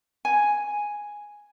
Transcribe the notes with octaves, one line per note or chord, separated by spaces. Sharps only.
G#5